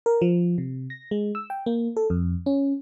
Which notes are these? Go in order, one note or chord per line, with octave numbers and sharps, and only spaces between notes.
A#4
F3
C3
A#6
G#3
E6
G5
A#3
A4
F2
C#4